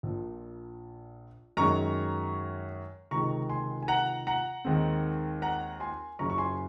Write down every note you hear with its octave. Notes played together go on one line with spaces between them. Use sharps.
A#1 A#2 F3
F#2 D#3 G#3 C#4 A#5 C#6
C#2 C3 D#3 G#3 A#5 C#6
G#5 C6
G#5
F#5 A#5
F#5 A#5
D#2 D#3 G#3 C4
F#5 A#5
G#5 C6
F#1 F#2 C#3 A#5 C#6
C#6
G#5 C6